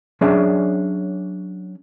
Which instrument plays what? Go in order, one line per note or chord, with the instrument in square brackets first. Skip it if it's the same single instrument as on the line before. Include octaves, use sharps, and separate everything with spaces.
[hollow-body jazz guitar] F#3 C#4 D4 G#4 D5 E5